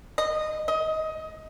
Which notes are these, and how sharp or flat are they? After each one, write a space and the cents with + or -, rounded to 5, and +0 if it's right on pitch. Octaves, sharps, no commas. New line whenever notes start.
D#5 -15
D#5 +20